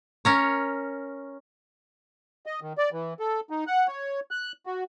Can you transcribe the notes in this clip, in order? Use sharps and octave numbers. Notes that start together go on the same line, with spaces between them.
C#4 A#4 C#5
D#5
D#3
D5
E3
A4
D#4
F#5
C#5
F#6
F#4